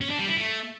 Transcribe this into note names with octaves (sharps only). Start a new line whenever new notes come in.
C#4
D4
G3
E4
A3